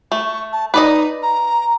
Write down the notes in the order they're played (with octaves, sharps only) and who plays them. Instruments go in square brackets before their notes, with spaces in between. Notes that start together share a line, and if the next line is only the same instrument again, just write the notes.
[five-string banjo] A3 [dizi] C#6
[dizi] A5
[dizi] D#4 [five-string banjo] B4 D5 D#5
[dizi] A#5